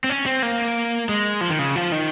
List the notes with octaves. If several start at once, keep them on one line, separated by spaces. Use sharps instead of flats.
C4
C#4
C4
A#3
G#3
F3
D#3
C#3
F3
D#3